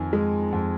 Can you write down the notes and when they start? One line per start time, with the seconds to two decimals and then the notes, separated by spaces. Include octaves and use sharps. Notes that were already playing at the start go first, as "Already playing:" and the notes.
Already playing: F2 D#3 G#5
0.13 G#3
0.53 F2